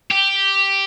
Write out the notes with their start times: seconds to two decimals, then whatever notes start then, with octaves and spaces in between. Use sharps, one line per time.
0.11 G4